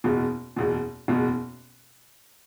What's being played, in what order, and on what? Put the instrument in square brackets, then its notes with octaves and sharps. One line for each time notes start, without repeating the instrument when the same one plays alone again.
[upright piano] F#1 E2 B2
F#1 E2 B2
F#1 E2 B2